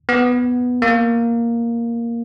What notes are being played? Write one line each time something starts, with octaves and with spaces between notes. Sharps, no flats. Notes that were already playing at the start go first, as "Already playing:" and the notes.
B3
A#3